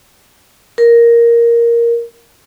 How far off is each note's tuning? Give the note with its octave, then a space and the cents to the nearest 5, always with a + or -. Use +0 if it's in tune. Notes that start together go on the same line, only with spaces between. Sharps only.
A#4 +5